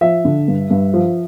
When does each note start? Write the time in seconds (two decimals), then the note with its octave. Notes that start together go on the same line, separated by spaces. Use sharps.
0.01 F3 E5
0.25 D3
0.48 G2
0.70 G2
0.94 F3